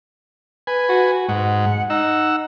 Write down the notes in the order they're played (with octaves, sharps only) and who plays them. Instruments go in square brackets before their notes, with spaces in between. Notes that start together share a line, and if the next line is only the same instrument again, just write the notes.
[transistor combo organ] B4 G#5
[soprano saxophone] F#4
[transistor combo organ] G#2 [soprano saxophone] F#5
[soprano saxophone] D#4 [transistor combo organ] F#5 E6